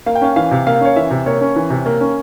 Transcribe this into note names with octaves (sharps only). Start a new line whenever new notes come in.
A#3 F5
G5
C#4 F5
E3 F5
C3
A#3 F5
C#4 C#5
E3 E5
C3
A#3 C#5
C#4
E3
C3
A#3
C#4